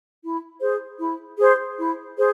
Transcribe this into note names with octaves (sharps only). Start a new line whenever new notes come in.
E4
G#4 C5
E4
G#4 C5
E4
G#4 C5